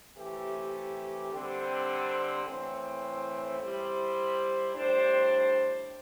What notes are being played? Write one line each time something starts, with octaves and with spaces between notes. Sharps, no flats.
C3 E3 A3 C4 G4
D3 G3 C4
A2 E3 C4
G3 E4 C5
A2 G3 D4 C5